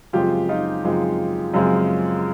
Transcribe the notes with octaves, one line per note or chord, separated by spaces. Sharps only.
F#2 C#3 F3 G#3 C4 F4 G4
D#4 F4
F#2 C#3 F3 G#3 C4
F#2 C#3 F3 G#3 C4